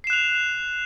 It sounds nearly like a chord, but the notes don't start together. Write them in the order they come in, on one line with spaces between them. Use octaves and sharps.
C7 E7 F#6 F7